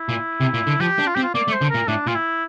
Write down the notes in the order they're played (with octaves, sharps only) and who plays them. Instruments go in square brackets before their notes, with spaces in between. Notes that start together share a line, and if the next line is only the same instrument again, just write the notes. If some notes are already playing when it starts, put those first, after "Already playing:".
Already playing: [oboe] E4
[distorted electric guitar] A#2
C3
A#2
D3
[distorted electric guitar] F3 [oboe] G4
[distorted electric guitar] D4
[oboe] F4
[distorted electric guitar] C4 [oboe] G4
[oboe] F4
[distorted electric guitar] A#3 [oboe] D5
[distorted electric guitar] A3
[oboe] C5
[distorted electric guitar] D3
[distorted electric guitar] A#2 [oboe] A#4
[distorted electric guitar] A2 [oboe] D4
[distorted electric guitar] A#2 [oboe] F4
[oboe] E4